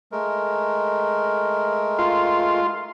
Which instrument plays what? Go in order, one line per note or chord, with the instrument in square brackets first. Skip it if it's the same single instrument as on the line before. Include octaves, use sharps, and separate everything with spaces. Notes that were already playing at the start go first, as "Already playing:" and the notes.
[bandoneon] G#3 A3 A#4
[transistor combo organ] F4